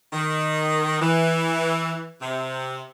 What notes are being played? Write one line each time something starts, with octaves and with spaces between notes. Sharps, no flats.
D#3
E3
C3